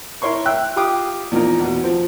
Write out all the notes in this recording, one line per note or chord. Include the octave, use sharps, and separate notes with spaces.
E4 A#4 C#5 C6 C#6
E5 G5 E6 F#6
F4 G4 F5 G5 D6 D#6
E2 A#2 F3 D#4 A#4
E2 B2
F3 C4